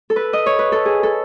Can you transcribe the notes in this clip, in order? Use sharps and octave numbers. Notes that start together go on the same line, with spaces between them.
A4
B4
D#5
C#5
B4
A4
G#4
A4